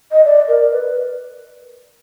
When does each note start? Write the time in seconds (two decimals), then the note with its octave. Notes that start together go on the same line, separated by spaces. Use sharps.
0.12 D#5
0.25 D5
0.48 A#4
0.72 B4